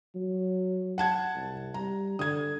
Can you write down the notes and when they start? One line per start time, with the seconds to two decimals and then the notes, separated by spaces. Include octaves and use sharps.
0.15 F#3
0.98 F#5 A5 G#6
1.36 C2
1.74 G3 A#5
2.19 D3 D#6 G#6